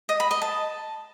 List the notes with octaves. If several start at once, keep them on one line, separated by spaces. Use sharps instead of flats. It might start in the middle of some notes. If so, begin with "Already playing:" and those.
D#5
B5
D#5
A5